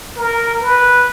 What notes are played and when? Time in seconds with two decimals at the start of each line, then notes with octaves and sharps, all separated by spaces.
0.16 A#4
0.60 B4